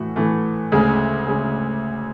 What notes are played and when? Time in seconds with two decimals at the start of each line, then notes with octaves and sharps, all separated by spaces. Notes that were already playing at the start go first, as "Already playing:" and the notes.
Already playing: A2 E3 A3 F#4
0.16 A2 E3 A3
0.72 D2 C#3 G#3
1.27 C#3 G#3